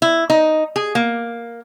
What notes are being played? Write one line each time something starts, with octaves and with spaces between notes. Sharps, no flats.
E4
D#4
G#4
A#3